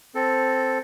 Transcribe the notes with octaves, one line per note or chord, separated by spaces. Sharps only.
C4 A4